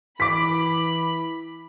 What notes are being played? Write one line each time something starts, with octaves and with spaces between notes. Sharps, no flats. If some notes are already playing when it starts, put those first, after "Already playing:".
E3 B5 D6 B6